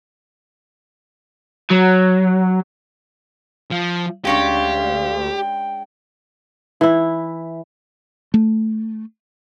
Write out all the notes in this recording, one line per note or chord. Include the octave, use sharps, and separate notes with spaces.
F#3
F3
D2 G#3 C#4 D4 G4 F5
G5
E3 E4
A3